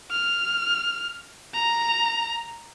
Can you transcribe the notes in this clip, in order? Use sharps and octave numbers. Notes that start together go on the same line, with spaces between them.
F6
A#5